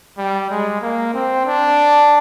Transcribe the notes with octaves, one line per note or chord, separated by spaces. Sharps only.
G3
G#3
A#3
C4
D4